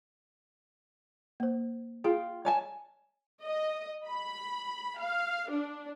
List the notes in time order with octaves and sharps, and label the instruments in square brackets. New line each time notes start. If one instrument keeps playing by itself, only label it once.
[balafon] A#3 C5
[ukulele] F4 G5 [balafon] G#4
[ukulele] C#5 G#5 A5
[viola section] D#5
B5
F5
D4